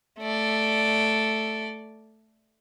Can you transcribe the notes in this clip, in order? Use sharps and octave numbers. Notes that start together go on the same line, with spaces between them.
A3 D5